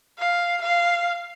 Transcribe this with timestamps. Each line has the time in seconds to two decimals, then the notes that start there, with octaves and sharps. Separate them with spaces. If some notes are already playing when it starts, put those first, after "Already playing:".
0.18 F5
0.62 F5